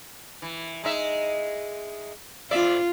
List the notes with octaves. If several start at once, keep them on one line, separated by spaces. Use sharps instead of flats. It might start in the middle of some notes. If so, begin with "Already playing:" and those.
E3
G#3 D#4 E5
F2 F4 D5 E5